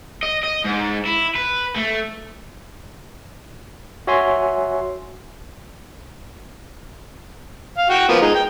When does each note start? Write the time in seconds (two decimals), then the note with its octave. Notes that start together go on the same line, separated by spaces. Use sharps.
0.23 D#5
0.44 D#5
0.65 G#2
1.05 E4
1.35 B4
1.76 A3
4.07 F#4 C#5 E5 G#5 C6
7.78 F5
7.90 F#4 F#5 G5
8.09 F3 A#3 B3
8.21 G#3 D#4
8.35 G5